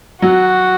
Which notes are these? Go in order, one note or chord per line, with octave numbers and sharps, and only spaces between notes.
F#3 F#4